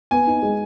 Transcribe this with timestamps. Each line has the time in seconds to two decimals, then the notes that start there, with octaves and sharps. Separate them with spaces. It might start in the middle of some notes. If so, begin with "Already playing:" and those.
0.11 B3 G#5
0.27 D#4
0.43 G#3